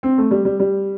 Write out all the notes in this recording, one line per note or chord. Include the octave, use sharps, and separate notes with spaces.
C4
A3
G3
G3
G3